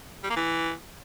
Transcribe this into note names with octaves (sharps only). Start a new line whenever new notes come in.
G3
A#3
E3